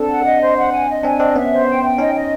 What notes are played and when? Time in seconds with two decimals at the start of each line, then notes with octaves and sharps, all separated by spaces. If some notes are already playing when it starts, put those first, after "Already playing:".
Already playing: C4 D4 A4
0.09 F#5
0.25 D#5
0.41 C5
0.57 F#5
0.72 G#5
0.89 D#5
1.03 C4 D4 G#5
1.19 C4 D4 D#5
1.35 B3 C#4 E5
1.51 C5
1.68 G5
1.83 G5
1.98 C#4 D#4 D#5
2.14 D#5